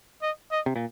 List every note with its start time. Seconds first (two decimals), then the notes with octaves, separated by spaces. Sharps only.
0.22 D#5
0.51 D#5
0.66 C3
0.76 A#2